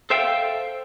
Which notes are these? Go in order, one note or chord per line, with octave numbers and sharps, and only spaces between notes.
A4 C5 E5 F5 G5